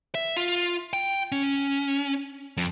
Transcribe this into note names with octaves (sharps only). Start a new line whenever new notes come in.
E5
F4
G5
C#4
F2